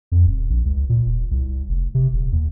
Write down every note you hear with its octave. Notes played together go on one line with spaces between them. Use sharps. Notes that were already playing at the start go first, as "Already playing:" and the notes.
F2
D#1
A#1
C#2
A#2
D#1
C2
F1
C3
D#1
D#2